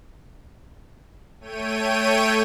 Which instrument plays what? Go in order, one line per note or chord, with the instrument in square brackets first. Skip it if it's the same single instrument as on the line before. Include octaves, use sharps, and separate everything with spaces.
[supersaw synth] A3 C#5 G5 D#7